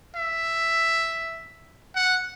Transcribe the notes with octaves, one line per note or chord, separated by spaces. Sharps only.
E5
F#5